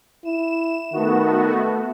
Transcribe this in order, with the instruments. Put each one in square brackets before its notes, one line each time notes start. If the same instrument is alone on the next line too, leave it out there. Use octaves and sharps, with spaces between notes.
[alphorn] E4 [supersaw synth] E7
[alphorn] D#3 [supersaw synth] A3 B3 F#4
[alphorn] A3